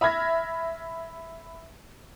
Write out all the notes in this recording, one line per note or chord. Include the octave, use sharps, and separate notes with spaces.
E5 B5 F6 G#6 A#6